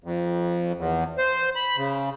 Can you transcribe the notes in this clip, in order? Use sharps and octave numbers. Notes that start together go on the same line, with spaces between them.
F2
E2
C5
B5
C#3